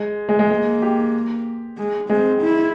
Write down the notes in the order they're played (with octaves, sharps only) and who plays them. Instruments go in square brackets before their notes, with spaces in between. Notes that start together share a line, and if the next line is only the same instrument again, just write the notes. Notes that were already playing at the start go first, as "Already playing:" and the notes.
Already playing: [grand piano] G#3
G#3
G#3
[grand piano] G#3 [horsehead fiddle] A#3
[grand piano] G4
[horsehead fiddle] G#3
[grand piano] G#3 [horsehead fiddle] C4
[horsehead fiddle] E4